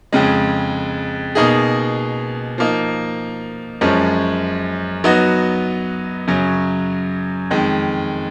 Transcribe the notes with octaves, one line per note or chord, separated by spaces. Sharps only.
F2 C#3 G#3
B2 A#3 D#4 G#4
F3 A#3 D#4
F#2 F3 G#3 C#4
F#3 B3 D#4 F#4
F#2 C#3 F#3 C#4
F2 D#3 G#3